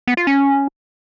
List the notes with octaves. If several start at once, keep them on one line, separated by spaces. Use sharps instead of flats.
B3
F4
C#4